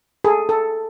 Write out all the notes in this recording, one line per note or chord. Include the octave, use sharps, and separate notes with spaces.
G#4 A4
A4